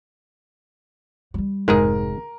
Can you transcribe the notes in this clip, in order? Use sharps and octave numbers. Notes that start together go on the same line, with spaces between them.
F#3 G3
F1 G#2 G#3 G#4 A#4